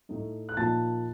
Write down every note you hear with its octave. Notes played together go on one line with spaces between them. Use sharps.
A2 A3 D#4
F#6
A#2 F3 A#3 D#4 A5 A6